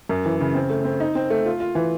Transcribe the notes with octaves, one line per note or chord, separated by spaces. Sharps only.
F#2
E3
C#3
C4
A3
C4
D#4
C4
A3
F4
F4
E3